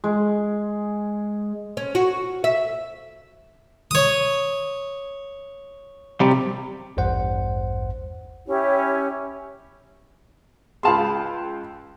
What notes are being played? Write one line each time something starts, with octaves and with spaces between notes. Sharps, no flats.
G#3
C#4
F#4
E5
C#5 D#6
C3 G3
A1 E2 G2 C5 F#5
C#4 E4 G4 C#5
C#2 G#4 F5 A5 B5 C6